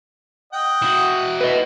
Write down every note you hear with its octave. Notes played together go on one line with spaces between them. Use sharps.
D#5 F#5 G5
E4 F#4
B4 D#5